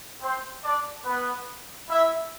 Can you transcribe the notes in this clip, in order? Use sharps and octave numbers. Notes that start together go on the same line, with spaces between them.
C4 C5
D4 D5
B3 B4
E4 E5